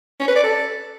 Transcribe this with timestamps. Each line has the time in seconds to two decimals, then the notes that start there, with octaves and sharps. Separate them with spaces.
0.20 C#4
0.28 B4
0.36 D5
0.44 A4